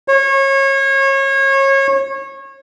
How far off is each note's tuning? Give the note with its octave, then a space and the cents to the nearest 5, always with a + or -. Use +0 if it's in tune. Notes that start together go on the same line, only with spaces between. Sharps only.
C#5 -30